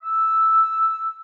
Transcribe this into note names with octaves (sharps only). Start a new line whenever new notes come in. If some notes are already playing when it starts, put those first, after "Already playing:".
E6